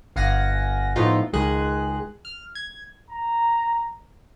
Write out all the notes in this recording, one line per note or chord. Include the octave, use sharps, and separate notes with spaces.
G1 F5 F#5 G#5 A#6
A2 F3 A3 B3 D#4 F4
C#2 D#3 G#3 G#4 F#6
F6
G#6
A#5